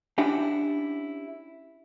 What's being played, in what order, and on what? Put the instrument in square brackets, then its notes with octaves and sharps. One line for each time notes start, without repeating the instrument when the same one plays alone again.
[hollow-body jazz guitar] C#4 D4 E4 G4 F#5